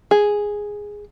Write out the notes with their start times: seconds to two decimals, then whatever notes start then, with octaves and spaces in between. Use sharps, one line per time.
0.11 G#4